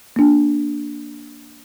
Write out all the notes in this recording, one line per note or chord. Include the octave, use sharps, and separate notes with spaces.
A#3 D4